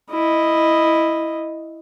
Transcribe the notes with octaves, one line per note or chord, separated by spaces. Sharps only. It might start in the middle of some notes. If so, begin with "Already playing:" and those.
E4 D#5